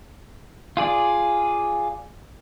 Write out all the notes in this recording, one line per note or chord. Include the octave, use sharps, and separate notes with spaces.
F4 G#4 D5